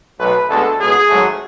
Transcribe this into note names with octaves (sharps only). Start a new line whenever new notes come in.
B1 B2 F#3 A3 B4
D2 D3 G#3 B3 A4
C#2 B2 G#3 B3 G#4
G#1 G#2 F#3 A3